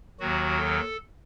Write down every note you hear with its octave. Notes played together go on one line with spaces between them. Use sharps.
D#2 D#3 F#3 F#4
A4